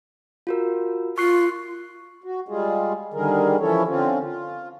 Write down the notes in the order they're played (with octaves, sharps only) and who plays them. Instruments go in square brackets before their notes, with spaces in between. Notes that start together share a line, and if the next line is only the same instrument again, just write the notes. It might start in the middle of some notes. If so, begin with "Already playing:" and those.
[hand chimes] F4 F#4 A#4
[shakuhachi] F4 [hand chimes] C#6 F#6 C7
[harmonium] F#4
G3 G#3 F4 G#4
D3 D#3 G3 G#4 A#4
E3 F3 C#4 E4 A4 C#5
D3 C4 C#4 F4
F4